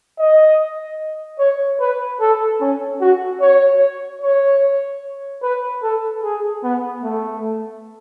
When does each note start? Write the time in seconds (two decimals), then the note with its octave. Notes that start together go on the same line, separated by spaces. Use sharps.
0.18 D#5
1.39 C#5
1.80 B4
2.20 A4
2.60 C#4
3.00 F#4
3.40 C#5
4.21 C#5
5.43 B4
5.82 A4
6.23 G#4
6.64 B3
7.03 A3